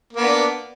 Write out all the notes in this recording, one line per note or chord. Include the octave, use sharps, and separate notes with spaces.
A#3 B3 D4